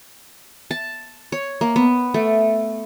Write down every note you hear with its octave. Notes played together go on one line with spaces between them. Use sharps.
A5
C#5
A#3
B3
A3